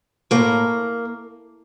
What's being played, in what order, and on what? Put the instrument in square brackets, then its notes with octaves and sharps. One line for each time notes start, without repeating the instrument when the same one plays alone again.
[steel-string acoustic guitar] A2 A#3